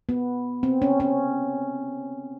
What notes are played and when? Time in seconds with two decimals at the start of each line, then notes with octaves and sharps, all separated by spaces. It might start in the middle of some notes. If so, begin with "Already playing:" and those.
0.09 B3
0.63 C4
0.82 C#4
1.00 C#4